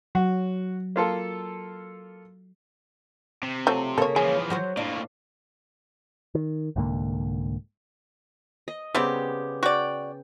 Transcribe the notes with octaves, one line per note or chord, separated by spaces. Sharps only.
F#3 F#4
A#3 F4 A4
C3
F3 F#3 A3
C#3 A#3 C#4 A4 C#5
E3 F3 G#4
F#3 F#4 C5
A2 A#3 D4
D#3
C2 G#2 D3 A#3
D#5
C#3 G3 B3 C4 G4
F#4 D5 G5